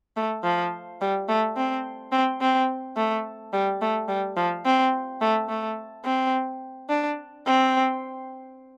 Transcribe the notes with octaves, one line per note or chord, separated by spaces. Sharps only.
A3
F3
G3
A3
C4
C4
C4
A3
G3
A3
G3
F3
C4
A3
A3
C4
D4
C4